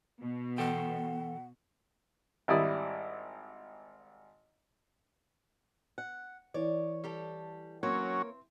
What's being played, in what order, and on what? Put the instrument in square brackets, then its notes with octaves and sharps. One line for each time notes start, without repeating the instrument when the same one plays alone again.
[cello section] B2
[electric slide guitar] E3 A4 G5 [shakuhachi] F#5
[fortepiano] G#1 G3 E4 D5 D#6
[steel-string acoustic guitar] F#5
[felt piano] E3 [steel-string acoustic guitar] C#5 [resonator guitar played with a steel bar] D5
[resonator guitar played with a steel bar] G3 G4 A4
[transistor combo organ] F#3 C#4 [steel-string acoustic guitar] A#3 A#4 C#5 [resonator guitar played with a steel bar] C4